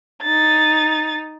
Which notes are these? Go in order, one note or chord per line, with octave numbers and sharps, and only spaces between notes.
D#4 A6